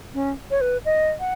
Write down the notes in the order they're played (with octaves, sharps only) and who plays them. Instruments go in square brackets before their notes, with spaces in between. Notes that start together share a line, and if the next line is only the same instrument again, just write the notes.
[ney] C#4
C#5
B4
D#5
F#5